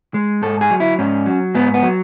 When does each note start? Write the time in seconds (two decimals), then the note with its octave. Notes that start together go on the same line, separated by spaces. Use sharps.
0.14 G#3
0.42 G#2 A4
0.61 G#4
0.70 F#3
0.80 E4
0.99 G#2 C#4
1.26 F#3
1.55 G#2 B3
1.74 B3
1.83 F#3